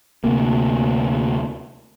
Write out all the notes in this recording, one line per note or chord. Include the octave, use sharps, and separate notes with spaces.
D2 C3 A#3